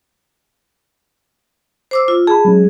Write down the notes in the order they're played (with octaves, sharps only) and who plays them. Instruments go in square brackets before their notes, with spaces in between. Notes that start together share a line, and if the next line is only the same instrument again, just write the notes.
[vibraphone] C5 D6 E6
F4
[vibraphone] G#4 [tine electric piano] A5 B5
[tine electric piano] F#3 G#3 C#4